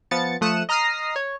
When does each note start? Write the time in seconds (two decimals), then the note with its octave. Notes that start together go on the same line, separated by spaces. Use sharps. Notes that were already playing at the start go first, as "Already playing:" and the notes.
0.11 F3 B3 A6 C#7
0.41 F3 A3 D#6 F#6 C#7 E7
0.69 D#5 A#5 D#6 F6 A#6 C7
1.16 C#5